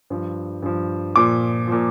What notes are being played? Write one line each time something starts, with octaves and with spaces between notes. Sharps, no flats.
G2 F3
G2 F3
A#2 F3 D6
A#2 F3